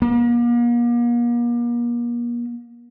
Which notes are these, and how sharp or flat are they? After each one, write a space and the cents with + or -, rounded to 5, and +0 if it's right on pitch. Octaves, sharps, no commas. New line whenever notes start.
A#3 +40